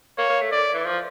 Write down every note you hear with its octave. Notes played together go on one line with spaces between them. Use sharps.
A#3 C#5
A#3
A3
D3 D5
E3
F3